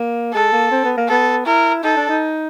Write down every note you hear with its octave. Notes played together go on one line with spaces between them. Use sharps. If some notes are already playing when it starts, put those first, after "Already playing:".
Already playing: A#3
G#3 A4
A#3
C4
B3
A#3
B3 A4
E4 A#4
D#4 A4
D4
D#4